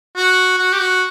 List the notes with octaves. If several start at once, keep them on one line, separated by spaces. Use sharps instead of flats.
F#4
F#4
G4
F#4